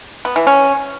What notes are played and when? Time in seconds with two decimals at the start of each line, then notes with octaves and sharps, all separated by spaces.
0.25 B3
0.36 E3
0.47 C#4